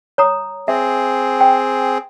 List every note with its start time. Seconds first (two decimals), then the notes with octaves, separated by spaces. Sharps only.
0.18 C#5 A#5 D#6
0.68 C4 G#4 E5
1.41 G5